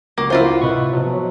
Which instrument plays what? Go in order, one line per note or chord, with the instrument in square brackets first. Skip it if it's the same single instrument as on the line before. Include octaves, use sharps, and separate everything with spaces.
[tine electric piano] C#2 F#4 [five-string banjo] A#3
[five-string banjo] E4 F4 C5 [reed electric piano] A#4 F5
[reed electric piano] F#5
[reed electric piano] A2 C3 D#5 [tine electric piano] B4 B5 C#6
[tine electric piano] B2 F3 F#3
[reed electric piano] C#5